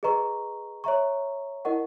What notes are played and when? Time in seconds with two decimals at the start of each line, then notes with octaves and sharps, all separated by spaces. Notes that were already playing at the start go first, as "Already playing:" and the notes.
0.03 G#4 B4 D#5 A#5 C#6
0.84 C#5 E5 A#5 C#6
1.65 E4 A#4 D#5 F#5 C#6